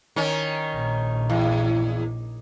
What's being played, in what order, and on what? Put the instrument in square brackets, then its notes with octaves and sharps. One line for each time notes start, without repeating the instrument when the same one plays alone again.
[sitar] D#3 C#4
[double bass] A#1
[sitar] E2